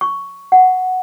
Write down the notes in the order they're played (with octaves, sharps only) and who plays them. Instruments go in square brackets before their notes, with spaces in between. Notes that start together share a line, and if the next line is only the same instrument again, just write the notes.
[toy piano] C#6
F#5